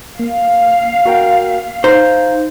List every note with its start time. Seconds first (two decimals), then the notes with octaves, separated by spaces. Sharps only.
0.19 A#3 F5
1.06 F#4 A#4 G5
1.84 D#4 C5 F5 A#5